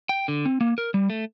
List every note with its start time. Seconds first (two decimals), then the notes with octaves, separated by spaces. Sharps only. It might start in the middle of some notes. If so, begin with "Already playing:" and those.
0.09 G5
0.28 D3
0.46 C4
0.61 A#3
0.78 A#4
0.94 G3
1.10 A3